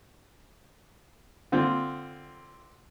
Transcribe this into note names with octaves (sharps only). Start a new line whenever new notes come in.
D3 C4 F4